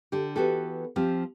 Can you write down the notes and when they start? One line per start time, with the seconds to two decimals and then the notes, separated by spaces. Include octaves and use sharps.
0.12 D3 G4
0.36 E3 B3 F#4 G4 A4
0.96 F3 C4 F4 G4